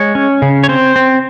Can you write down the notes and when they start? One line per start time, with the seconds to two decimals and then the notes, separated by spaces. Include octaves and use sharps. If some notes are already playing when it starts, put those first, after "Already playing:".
Already playing: G#3 C#5
0.15 C#4
0.42 C#3
0.63 C#5
0.69 C4 C5
0.96 C4